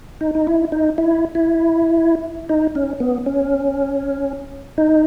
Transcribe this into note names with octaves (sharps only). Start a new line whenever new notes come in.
D#4
D#4
E4
D#4
E4
E4
D#4
C#4
B3
C#4
D#4